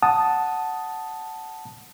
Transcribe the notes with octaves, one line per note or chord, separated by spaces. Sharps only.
F#5 A5 D#6